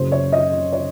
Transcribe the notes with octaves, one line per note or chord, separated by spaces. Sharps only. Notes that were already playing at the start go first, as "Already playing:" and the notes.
Already playing: F#1 F#2 C#3 F#3 C5
C#5
D#5
C#5